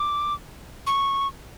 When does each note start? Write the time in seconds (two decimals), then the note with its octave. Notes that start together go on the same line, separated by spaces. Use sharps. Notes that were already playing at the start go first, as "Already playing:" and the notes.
Already playing: D6
0.87 C#6